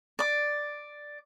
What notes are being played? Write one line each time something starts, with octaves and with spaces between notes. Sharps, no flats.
D5 D6